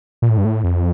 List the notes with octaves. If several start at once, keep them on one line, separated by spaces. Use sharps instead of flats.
A#2
A2
G2
A2
F2